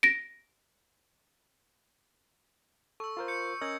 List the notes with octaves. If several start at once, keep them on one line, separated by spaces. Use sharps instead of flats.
A#6 D7
A4 C#6 E6
F4 A#4 C5
G6 C#7
C#4 A#4 D#5 E6 G#6